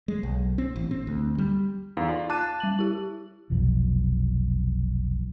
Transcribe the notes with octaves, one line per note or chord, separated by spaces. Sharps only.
G#3
B1
C4
A1
C4
D2
G3
E2 D#4 F5
F4 D5
A5 D6 F#6 D#7
G3 F#7
E4 G4
F1 B1 F3